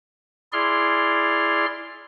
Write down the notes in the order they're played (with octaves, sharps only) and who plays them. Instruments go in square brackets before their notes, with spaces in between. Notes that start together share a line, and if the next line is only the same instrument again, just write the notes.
[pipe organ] E4 G#4 D5 C6 F6